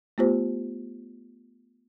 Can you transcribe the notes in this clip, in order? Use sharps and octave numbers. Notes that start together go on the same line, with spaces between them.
A3 B3 F4 G4 C5